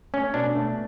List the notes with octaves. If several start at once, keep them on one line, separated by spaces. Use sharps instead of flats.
A3 C#4
B2 D4
A3